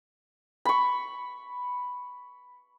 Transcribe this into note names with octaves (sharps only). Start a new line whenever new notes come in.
B5 C#6